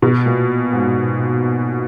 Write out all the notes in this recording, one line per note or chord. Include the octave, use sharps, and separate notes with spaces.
B2
A#2
G#2